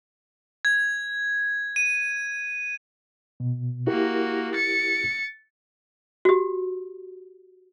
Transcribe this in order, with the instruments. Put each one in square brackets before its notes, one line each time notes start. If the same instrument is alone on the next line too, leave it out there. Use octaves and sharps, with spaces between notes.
[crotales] G#6
D#7
[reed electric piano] B2
[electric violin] A#3 F#4 [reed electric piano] E4 G4 A#4
[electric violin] A6 C#7
[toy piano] F#4 G4